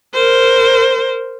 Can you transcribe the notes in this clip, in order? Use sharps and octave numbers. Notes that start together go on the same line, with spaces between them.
A#4 C5